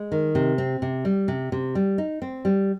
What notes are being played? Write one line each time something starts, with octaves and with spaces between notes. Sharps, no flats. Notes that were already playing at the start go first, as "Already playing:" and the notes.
Already playing: G#3
D#3
C3
C4
C3
G3
C3
C3
G3
D#4
C4
G3